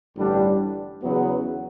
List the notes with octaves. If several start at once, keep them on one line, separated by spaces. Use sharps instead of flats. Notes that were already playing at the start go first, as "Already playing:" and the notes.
A1 G2 D3 G3 D4
E2 C#3 F#3 B3